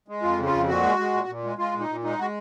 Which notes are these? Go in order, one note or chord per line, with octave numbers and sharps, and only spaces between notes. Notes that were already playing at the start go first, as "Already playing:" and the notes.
G#3
F2 F4
C#3
F4
F2
A#2 F#4
G#3
G#3
A#2
A#2
G#3
G#3 F4
A#2
D#4
A#2
G#3 D#4
G#3 F#4